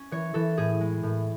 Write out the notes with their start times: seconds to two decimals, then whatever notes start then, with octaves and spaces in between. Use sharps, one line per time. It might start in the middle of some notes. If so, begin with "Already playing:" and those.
Already playing: C#4
0.11 E3 C#5
0.34 E3 A4
0.58 A2 G#4
0.81 G#3
1.03 A2